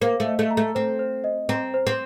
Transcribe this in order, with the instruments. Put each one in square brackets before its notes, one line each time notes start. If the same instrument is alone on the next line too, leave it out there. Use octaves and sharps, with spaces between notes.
[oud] A#3 [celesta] C5
[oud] A3
[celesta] D#5
[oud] A3
[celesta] A#5
[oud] A3
[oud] C4 [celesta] C5
[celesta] C5
D#5
[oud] C4 [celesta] A#5
[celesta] C5
[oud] C4